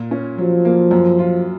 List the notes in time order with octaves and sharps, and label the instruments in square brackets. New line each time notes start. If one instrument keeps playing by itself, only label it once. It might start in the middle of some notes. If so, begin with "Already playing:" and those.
Already playing: [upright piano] A#2
C#4
[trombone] F3 [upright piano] F#3
[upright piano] A#3
F#2
F4